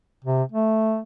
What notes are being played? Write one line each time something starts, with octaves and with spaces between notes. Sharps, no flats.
C3
A3